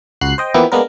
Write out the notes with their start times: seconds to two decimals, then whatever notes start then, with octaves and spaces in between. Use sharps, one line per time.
0.21 C#2 F#4 F#6 C7
0.38 C5 D#5 G5
0.54 E3 F3 A#3 B3 E4 G4
0.72 G#3 A#3 B3 D4 A#4